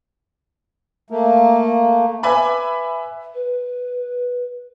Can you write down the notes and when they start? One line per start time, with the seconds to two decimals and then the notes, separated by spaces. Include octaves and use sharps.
1.10 A3 A#3
2.23 B4 E5 G#5 B5 D6
3.34 B4